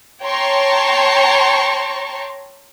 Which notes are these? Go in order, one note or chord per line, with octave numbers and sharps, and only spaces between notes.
C#5 G5 A5 A#5 C6 C#6